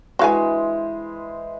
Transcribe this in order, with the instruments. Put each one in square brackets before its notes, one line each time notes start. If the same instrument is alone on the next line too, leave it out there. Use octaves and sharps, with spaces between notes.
[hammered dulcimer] E3 G#3 C5 [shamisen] F#4 F5 G#5